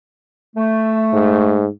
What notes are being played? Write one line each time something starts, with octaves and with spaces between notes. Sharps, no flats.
A3
G#2